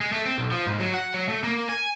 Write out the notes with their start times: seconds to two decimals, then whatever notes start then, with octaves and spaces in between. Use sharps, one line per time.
0.01 G#3
0.13 A3
0.25 C4
0.38 B1
0.51 F3
0.67 G#2
0.80 F#3
0.94 F#5
1.14 F#3
1.29 A3
1.44 A#3
1.69 G#5